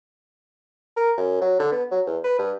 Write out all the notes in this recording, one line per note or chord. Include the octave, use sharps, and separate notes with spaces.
A#4
F#2
F#3
D3
B3
F#3
E2
B4
G2